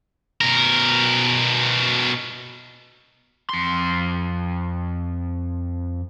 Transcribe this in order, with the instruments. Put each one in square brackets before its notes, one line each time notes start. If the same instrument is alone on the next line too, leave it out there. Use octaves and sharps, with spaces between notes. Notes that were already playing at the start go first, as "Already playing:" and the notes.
[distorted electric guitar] B2 A#4
[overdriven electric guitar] F2 C6